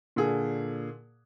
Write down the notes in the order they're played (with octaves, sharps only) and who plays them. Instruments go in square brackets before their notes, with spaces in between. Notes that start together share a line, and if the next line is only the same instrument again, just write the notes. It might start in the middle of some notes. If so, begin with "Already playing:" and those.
[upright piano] A#2 D3 G#4